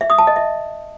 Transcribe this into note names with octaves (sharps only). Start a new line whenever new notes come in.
E5
D#6
A5
D#5
E5